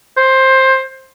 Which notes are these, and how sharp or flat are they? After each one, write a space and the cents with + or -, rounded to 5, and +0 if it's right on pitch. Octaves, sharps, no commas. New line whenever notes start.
C5 +15